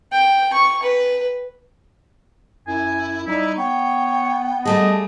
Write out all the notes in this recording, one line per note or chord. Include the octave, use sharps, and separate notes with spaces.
G5
C#6
B4
F#2 E4 G#5
G3 D#4 E4
B3 C#5 G5
G3 A3 G#4 D#5 A5